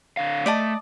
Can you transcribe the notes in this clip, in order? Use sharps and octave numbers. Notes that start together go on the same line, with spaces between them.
D3 F5
A3 D5 D#5 A5